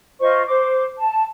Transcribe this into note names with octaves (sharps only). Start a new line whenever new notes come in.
F4 C5 D#5 C#6
C5 D6
A5